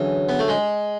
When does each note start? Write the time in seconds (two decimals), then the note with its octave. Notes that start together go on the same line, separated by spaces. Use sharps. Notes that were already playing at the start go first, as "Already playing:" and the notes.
Already playing: D3 E3 F#3 C#4 G#4
0.29 B3
0.39 A3
0.48 G#3